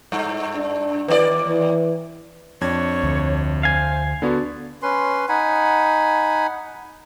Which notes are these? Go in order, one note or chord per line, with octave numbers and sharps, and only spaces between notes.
G2
D4
D#2 C4 B4 D5
E3
F2 D4 C#5 G#6
D2
C5 F5 G#5
D3 B3 F#4 D5
C#4 B4 C6
D#4 F#5 G#5 B5